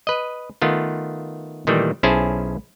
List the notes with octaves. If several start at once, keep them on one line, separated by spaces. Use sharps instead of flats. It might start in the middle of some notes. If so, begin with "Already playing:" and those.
B4 D#5
D#3 A3 B3 F4
A#2 D#3 E3 G3 A3
B1 C#4 E4 G#4 C5 A5